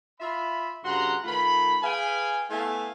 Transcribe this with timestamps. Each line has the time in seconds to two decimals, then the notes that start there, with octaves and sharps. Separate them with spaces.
0.21 F4 E5 B5
0.85 G2 C#3 F#4 F#5 A#5 C6
1.24 D#3 A3 F4 B5
1.82 G#4 B4 F5 G5 G#5
2.50 A3 B3 E4 E5 F5 G#5